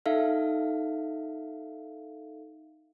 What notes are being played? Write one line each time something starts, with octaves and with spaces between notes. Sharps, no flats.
D#4 A4 E5 F5